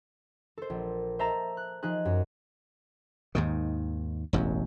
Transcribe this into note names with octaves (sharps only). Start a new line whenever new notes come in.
A4 C5
A#1
C5 E5 A5 A#5
F#6
F3 D#4 G#4 F#6
F#2
D#2 G#2 D#3
E1 A1 F#2